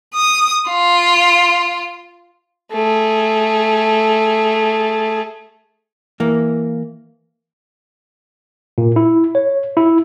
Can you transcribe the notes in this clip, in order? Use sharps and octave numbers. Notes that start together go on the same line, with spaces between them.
D#6
F4
A3 G#4
E3 A#3
A#2
E4
C#5
E4